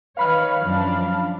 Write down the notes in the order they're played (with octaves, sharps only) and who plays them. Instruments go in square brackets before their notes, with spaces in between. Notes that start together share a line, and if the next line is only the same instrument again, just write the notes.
[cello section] D#3 B4 C#5 [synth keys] F5 B5 F6
[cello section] F#2 F3 D4